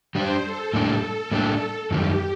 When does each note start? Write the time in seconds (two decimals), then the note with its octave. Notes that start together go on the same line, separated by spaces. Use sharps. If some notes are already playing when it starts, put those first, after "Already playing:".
0.15 G3 D4 G4 C5
0.44 A4
0.74 A2 G3 A#3 D4 G4
1.31 A2 G3 A#3 D4 G4
1.90 F#2 D#3 G3 G4